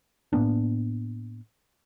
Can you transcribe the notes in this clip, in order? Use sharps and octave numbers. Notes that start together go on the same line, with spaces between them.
A2 A#3 B3 D4